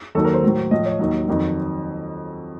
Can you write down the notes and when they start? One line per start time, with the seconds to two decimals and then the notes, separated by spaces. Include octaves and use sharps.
0.15 D#2 D#3 F#3 A4
0.25 A#4
0.34 C5
0.43 A2 F#3
0.71 A2 F3 D#5
0.86 C#5
0.99 D#2 D#3 F#3 D#5
1.28 F2 D#3 F#3